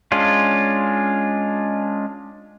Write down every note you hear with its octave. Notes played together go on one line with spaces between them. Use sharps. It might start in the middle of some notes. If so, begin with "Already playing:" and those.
G#3 C#4 D4 F4